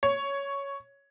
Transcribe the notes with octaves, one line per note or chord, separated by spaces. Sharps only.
C#5